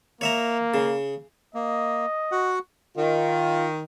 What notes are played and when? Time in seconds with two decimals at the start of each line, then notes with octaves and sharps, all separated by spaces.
0.21 A#3 C#5 E5 A#5
0.74 C#3
1.55 A#3 D#5
2.32 F#4 F#5
2.97 D#3 F4